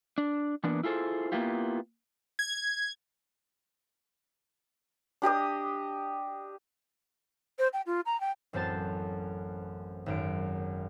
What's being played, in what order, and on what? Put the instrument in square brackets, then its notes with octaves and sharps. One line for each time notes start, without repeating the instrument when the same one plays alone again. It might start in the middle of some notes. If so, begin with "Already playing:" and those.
[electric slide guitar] D4
E3 A#3 B3 D4
E4 F4 G#4 A4 C5
A#3 B3 E4 F4 G4
[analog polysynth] G#6
[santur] D4 G4 D#5 D#6
[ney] C5
G5
F4
A#5
G5
[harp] A1 F#2 C4 C5 A5 A6
G#1 F#2 D7